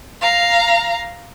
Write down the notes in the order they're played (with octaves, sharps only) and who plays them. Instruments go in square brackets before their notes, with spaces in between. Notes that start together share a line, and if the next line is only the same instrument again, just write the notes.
[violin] F5 A#5